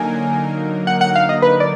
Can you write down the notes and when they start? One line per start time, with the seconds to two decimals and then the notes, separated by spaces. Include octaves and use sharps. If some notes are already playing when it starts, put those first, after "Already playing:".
Already playing: D3 F#3 A#3 D#4 A#4 G#5
0.87 F#5
1.01 F#5
1.15 F5
1.29 D#5
1.42 B4
1.60 D5